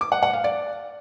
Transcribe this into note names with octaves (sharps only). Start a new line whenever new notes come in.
D6
F#5
F#5
F5
D5